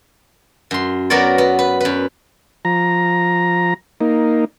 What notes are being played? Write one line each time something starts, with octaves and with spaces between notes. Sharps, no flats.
F#2 C6
F#3 B3 A#4 C#5 D5
B3
B4
F#2 B4
F3 A#5
A#3 D#4